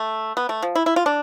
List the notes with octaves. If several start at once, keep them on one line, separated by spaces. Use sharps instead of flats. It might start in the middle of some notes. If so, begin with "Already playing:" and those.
Already playing: A3
B3
A3
F3
E4
E4
F4
D4